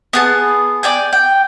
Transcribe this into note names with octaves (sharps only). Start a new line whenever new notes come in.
B3 G#4 A5
D5 G5 G#5
G5